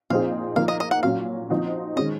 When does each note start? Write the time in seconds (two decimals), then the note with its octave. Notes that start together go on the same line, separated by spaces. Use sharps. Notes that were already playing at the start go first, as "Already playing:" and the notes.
0.10 A#2 F3 C4 D#4 G#4 F5
0.56 F3 A#3 D#4 A#4 F5
0.68 D#5
0.80 D#5
0.91 F#5
1.03 A#2 F#3 C#4 F5
1.50 F3 C4 D#4 F#4 C5
1.96 D#3 G#3 C#4 D#5